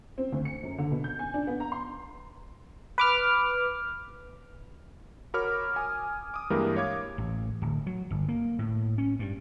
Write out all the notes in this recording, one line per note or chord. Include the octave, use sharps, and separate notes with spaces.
C4
D2
C#7
F#2
D3
B2
G6
G#5
D4
B3
A#5
C6
B4 D6 F6
F#4 A#4 C#5 B5 D6 F6
G#5 D#6
D6 D#6
G2 E3 G#3 A#3 G4 A#4
C#5 F5 D6 G#6
A1
D1
F#3
G1
A#3
A2
C#4
G2